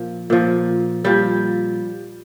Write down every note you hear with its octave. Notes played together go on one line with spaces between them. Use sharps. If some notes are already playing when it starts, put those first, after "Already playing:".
Already playing: A#2 F3
A#2 F3
A#2 F3 G3